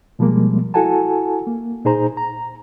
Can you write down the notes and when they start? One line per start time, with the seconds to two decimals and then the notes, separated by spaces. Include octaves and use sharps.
0.19 B2 F3 G3 G#3 A#3
0.74 E4 F#4 A4 F#5 G#5 A5
1.47 A#3
1.85 A#2 D#4 G#4 C5 A#5
2.17 A#5